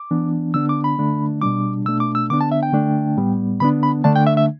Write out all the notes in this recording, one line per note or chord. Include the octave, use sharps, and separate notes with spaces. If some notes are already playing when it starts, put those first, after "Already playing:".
Already playing: D6
E3 B3 D4
D3 B3 D4 E6
D6
B5
D3 A3 D4
B2 G3 D4 D6
B2 A3 D4 E6
D6
E6
D3 B3 D4 D6
A5
E5
G5
D3 A3 D4
A2 G3 B3
D3 B3 D4 B5
B5
D3 A3 D4 A5
G5
E5
E5